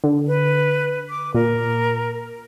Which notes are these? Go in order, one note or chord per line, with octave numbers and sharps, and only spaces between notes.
D3
B4
D6
A#2 A#4